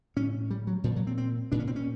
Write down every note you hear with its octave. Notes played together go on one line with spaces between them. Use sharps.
A2 C#4
G3
F#3
A#2 F3
F#3
C4
C4
A#2 D4
C#4
C4
C#4